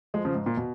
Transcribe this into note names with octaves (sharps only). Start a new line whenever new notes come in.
F3 G#3
C#3 F3
G#2
A#2
B2